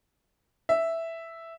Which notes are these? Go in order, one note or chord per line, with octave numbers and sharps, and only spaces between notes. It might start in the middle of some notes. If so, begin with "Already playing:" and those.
E5